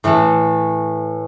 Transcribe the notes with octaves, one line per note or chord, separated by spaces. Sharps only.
A2 E3 A3